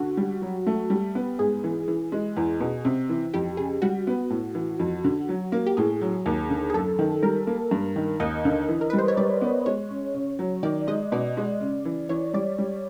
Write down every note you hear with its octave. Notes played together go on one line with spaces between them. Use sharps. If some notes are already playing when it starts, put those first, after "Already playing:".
Already playing: D3 F#4
G3
F#3
A3
G3
B3
G#2 G#4
E3
E3
G#3
E2
B2
C3
E3
F2 G4
C#3 G#4
G3 F#4
B3
A2
E3
F2
D3
F#3
A#3
G4
A2 G#4
F#3
D#2
D3
G#4
F#2 A4
D#3
G3 A#4
A#3
G2
D#3
D#2 D#5
D3
E3
A#4
G3 B4
C5
C#5
G3 D5
B3
G#3 C#5
C#4
C#3
F#3
D#3 D5
G#3 D#5
B2 D5
G#3
C#3
E3
E3 C#5
G3 D5
G3